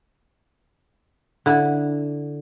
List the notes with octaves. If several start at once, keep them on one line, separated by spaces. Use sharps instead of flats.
D3 E4